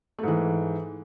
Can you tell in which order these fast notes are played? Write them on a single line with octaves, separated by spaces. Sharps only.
A3 G#2 E3